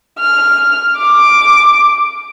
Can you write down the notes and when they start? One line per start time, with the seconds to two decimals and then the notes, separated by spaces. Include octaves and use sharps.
0.20 F6
0.98 D6